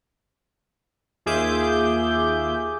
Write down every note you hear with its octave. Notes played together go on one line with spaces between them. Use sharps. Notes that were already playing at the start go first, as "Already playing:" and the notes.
D#2 F4 G#4 E5 D6 G6